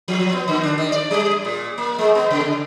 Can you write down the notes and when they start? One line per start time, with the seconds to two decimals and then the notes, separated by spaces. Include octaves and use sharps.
0.08 F3
0.33 B3
0.48 D3
0.63 D4
0.78 D#3
0.92 D5
1.11 G3
1.45 A#2
1.78 A#3
1.99 G#3
2.15 B3
2.31 C#3